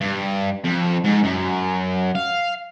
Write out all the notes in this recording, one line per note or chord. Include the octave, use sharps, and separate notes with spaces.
G2
F2
G#2
F#2
F5